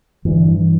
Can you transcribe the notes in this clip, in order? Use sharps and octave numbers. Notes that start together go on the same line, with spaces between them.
G2 D3 E3
E3